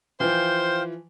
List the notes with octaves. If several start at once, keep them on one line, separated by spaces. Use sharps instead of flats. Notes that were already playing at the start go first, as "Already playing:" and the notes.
E3 F3 C5 F5 G5